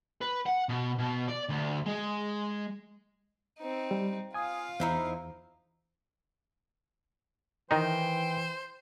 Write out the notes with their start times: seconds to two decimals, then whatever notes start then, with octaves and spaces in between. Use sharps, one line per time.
0.21 B4
0.46 F#5
0.69 B2
0.99 B2
1.29 D5
1.49 D2
1.86 G#3
3.59 C4 D#4
3.91 G3
4.34 F4 F5 G#5 D#6
4.80 E2 D#4 E4 C5
7.71 D#3 E3 D#4 C5 G5